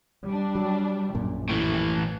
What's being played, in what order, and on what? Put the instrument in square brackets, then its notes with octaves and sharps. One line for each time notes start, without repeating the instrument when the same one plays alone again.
[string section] G3 D4
[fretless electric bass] F#3
[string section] A#1 [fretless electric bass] F#2 A#2
[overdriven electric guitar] A2 E3